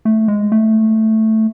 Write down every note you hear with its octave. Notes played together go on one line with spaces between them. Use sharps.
A3
G#3
A3